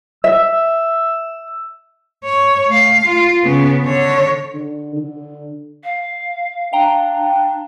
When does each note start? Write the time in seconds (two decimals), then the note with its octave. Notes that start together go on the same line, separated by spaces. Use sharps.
0.24 E5 E6
2.24 C#5
2.68 A3 F5
3.04 F4
3.44 C#3 B3
3.84 D3 C#5
4.54 D3
4.96 D3
5.84 F5
6.73 D4 F5 G5 A#5